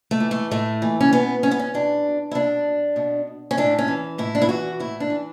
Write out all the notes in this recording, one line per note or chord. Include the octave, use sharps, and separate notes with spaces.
A3
E3
A3
A2 A3
E3
C#4
B2 B3
C#4
B3
C#4
B2 D4
E4
B2 D4
B2
C#4
A2 D4
C#4
E3
A2 E4
D4
E4
E3 F#4
A2 E4
D4
E3